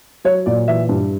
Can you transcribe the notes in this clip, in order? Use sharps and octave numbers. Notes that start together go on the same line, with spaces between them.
F#3 C#5
A#2 D5
E3 E5
G2